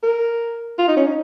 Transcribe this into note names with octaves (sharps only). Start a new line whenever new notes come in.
A#4
F4
D#4
C#4
D#4